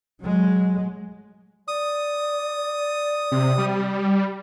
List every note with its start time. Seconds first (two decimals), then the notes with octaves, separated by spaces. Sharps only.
0.21 F#3 G#3
1.68 D5 D#6
3.31 C3
3.58 G3